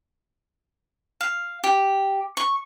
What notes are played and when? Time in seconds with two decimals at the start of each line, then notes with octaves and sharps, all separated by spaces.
1.21 F5
1.64 G4
2.37 C#6